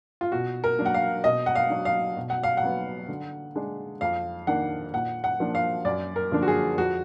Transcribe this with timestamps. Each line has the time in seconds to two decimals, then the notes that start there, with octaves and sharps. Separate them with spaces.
0.21 F4
0.32 B2 F#4
0.64 A#4
0.79 F#3 A#3 D4
0.86 F#5
0.94 F5
1.24 B2 D#5
1.46 F#5
1.55 F5
1.70 F#3 D4
1.85 F5
2.17 B2
2.30 F#5
2.43 F5
2.57 F#5
2.63 F#3 B3
3.08 D3
3.56 G#3 D4
4.01 F2 F5
4.47 D#3 A#3 D4 F#5
4.93 A#2 F#5
5.24 F#5
5.40 F3 A#3 D4
5.55 F5
5.85 F#2 D5
6.16 A#4
6.32 D3 F3 A#3 D4
6.42 F#4
6.48 G#4
6.78 F2 F#4